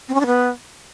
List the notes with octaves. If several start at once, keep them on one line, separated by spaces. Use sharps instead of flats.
C4
C#4
D4
B3